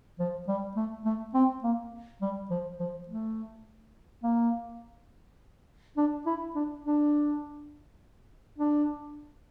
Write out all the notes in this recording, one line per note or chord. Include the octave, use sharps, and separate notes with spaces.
F3
G3
A3
A3
C4
A#3
G3
F3
F3
A3
A#3
D4
E4
D4
D4
D4